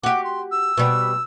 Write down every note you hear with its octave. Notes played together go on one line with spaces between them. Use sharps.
F#4 G4 D6
C6
E6
B2 G3